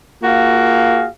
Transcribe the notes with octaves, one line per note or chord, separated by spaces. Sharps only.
A#3 F4 F#4 G#4 F5